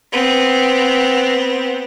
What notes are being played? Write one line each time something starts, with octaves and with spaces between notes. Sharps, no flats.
B3 C4